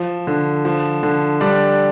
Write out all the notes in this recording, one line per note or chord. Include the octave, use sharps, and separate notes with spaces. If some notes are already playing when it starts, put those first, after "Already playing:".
Already playing: F3
D3
F3
D3
G3 D4